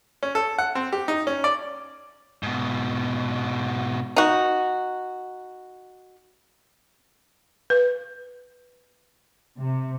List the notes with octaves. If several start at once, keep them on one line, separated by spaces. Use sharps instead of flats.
C#4
A4
F#5
C4
G4
D#4
C#4
D5
G#2 B2
D#4 F#4
B4
C3